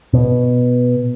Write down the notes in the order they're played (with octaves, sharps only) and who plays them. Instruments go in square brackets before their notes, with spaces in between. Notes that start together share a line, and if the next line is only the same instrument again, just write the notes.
[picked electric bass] B2